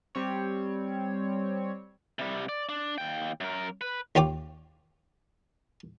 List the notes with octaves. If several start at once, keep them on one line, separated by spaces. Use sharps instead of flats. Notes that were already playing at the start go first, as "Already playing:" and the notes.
G3 C4 C#5
C3 G3
D5
D4
D#2 G5
F#2 A#4
B4
D#2 F4 C#5 G5 D6